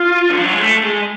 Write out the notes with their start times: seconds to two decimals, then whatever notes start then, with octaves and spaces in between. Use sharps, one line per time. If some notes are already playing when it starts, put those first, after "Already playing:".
Already playing: F4
0.30 D3
0.37 F3
0.45 F#3
0.52 G#3
0.60 A3
0.84 G#3